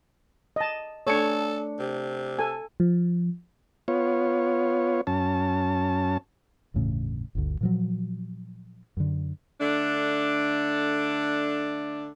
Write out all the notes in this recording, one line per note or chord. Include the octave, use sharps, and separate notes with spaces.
D#5 A5
A3 D4 A4 C#5 C#7
C3
A4 G#5
F3
B3 F4 C#5
F#2 C#4 A5
G1 E2 A2 C#3
G1 D2
A#2 F3 F#3
F#2 D3
D3 A3 D4